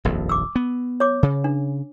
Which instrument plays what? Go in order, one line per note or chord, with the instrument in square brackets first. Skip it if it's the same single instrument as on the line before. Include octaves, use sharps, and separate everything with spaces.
[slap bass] D#1 A#1 F2
[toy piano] D6 E6
[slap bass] B3
[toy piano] C#5 D6
[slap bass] C#3
[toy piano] D4